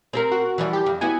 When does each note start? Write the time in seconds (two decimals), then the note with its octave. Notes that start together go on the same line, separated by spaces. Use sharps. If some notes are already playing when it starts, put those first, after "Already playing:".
0.13 C4 G4 A#4
0.32 F#4
0.58 E3 F3 G3
0.73 G4
0.86 F2
1.01 B3 E4 F#4 G#5